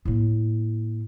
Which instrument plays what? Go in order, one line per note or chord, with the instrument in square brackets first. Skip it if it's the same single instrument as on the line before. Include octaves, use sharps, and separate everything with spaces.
[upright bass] A2 A#3